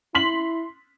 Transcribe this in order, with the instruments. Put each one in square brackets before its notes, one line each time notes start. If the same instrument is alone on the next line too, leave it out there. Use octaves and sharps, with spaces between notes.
[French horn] E4 [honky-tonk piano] C6 B6 F#7